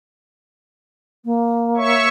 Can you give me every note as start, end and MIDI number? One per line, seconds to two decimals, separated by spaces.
1.25 2.07 58
1.77 2.09 73
1.77 2.09 76
1.77 2.09 85